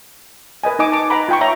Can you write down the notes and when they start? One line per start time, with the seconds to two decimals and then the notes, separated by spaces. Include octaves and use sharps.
0.64 A#4 B4 D#5 G#5
0.79 D#4 D#5 G#5 D6
0.92 A5 D6
1.10 B4 F#5 A#5 B5
1.29 F4 G5 C#6
1.41 C#5 E5 G5 A#5